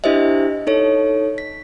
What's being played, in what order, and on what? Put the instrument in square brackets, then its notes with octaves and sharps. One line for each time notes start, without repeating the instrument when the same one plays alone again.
[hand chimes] D4 E4 G4 C5 D#5 E5
D#4 A4 C#5
B6